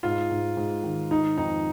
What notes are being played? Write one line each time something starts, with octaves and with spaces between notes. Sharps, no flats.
G#2 F4
G#2
G#2
D#3
D#3 D#4
F2 D#4